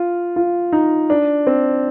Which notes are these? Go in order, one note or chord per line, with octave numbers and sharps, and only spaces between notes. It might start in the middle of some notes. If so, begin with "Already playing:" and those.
Already playing: F4
F4
D#4
D4
C4